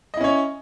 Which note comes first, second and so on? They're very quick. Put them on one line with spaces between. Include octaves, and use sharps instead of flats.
D#5 E4 C#4 C#5